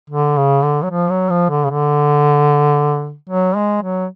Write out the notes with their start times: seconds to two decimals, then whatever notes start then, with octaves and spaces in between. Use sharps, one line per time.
0.10 D3
0.37 C#3
0.63 D3
0.83 F#3
0.90 F3
1.10 F#3
1.30 F3
1.49 D3
1.64 C#3
1.70 D3
3.29 F#3
3.56 G#3
3.82 F#3